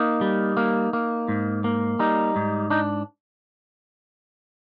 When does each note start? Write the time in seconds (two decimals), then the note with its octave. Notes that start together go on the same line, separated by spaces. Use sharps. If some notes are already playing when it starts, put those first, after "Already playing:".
Already playing: A#3 D#4
0.21 G3
0.57 A#3
0.93 A#3
1.28 G#2
1.64 A#3
1.99 G3 D#4
2.36 G#2
2.70 D4 D#4